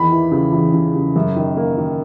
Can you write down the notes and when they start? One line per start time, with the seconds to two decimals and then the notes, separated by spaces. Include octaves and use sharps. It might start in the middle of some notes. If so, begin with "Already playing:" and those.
Already playing: E2 D#3 B5
0.12 E3
0.32 C#3
0.52 E2
0.74 C#3
0.95 C#3
1.16 F#2
1.36 D#3
1.57 A#3
1.78 D#3